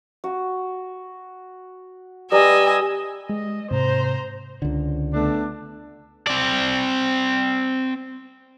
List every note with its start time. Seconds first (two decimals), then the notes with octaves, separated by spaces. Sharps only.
0.24 F#4
2.32 G3 B4 D#5 G#5 A#5 E6
3.29 G#3 D#5
3.71 G#2 C3 C5 A#5
4.62 C#2 D3
5.14 A3 B3 D4
6.27 C4 D5